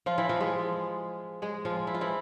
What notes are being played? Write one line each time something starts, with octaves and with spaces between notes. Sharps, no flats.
F3 F4
E3 E4
F3 F4
G#3 G#4
G#3 G#4
F3 F4
E4
F4
E3 E4